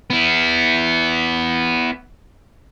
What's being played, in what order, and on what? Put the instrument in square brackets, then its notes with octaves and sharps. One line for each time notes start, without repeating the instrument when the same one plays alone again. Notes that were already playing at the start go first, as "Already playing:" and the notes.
[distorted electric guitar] B3 E4